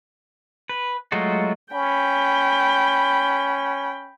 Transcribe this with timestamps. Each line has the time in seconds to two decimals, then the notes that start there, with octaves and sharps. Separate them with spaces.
0.69 B4
1.12 F#3 G#3 A3 F4 F#4
1.73 C#4 G5 B5